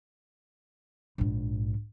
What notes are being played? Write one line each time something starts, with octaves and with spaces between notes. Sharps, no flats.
A#1 G#2